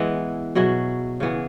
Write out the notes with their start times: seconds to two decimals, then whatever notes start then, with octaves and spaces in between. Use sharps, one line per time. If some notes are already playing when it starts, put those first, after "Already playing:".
Already playing: E3 G#3 B3 E4
0.55 B2 F#3 E4 G#4
1.20 C#3 E3 B3 G#4